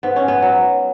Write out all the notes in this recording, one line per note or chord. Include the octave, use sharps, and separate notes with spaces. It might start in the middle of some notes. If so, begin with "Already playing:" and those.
G#2 B3
C#4
B3
F#3